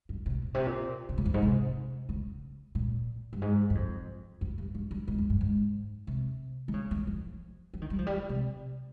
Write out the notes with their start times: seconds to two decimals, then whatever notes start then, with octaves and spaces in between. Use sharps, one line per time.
0.09 G2
0.26 C3
0.42 A#2
0.54 C3
0.67 A#2
1.09 C3
1.18 C#3
1.25 F2
1.34 G#2
1.42 C3
2.09 C#3
2.75 A#2
3.33 G2
3.42 G#2
3.70 G2
3.75 F2
4.41 F2
4.58 G2
4.75 G2
4.91 G2
5.08 G#2
5.18 F2
5.30 G2
5.41 G#2
6.07 C3
6.68 D#3
6.74 C#3
6.91 D#3
7.07 F3
7.74 F3
7.82 D#3
7.90 G3
7.98 F3
8.07 G3
8.29 C3